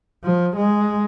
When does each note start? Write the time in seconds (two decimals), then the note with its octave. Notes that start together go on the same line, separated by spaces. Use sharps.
0.24 F3
0.56 G#3